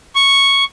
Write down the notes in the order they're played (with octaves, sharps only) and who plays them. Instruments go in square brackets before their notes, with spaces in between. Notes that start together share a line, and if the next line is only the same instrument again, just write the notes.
[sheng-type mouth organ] C#6